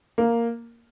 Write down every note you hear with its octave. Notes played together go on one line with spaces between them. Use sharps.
A#3